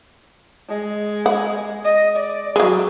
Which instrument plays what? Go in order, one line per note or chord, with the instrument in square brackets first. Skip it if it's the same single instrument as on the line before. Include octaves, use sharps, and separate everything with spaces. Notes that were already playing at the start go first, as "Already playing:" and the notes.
[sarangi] G#3
[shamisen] F#5
[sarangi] D#5
D5
[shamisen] F#3 G#3